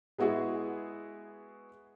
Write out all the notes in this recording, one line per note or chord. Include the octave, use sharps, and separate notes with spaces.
G#3 B3 E4 F#4 G#4